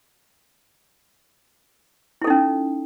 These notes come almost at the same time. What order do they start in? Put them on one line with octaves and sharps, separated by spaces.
E4 A4 D#4 C#4